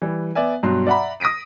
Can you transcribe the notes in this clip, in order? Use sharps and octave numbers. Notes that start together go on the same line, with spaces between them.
E3 G3
B3 D5 E5 G#5
G2 B2 F#3 C6
D5 E5 F#5 A#5 B5
D#6 A#6 B6 D7 D#7